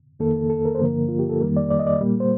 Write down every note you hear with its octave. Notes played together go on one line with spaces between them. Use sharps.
F2 D#3 A#3 A4
A4
A#4
C5
G2 D3 F3 A#3 A#4
F4
G4
A4
F2 D#3 G3 A#3 A#4
D5
D5
D#5
D5
A#2 G3 A#3
C5